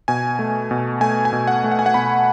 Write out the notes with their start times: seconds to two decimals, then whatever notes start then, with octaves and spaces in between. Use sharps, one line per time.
0.08 B2 G#5
0.39 A3
0.71 B2
1.01 A3 G#5
1.25 G#5
1.33 B2
1.47 F#5
1.64 A3
1.71 F#5
1.79 G#5
1.86 F#5
1.94 B2 B5